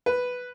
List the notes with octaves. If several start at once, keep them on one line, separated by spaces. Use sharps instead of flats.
B4